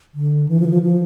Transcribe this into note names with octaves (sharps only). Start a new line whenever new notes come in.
D3
E3
F3
E3
F3
F3